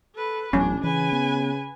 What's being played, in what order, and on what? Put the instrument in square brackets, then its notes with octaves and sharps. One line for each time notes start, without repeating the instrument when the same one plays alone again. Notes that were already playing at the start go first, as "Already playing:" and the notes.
[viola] A4 B4
[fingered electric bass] D#1 F#3 B3 [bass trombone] A1 [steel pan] C#4 [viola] D4
[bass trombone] C#3 [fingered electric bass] E3 [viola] B4 G#5
[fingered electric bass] B3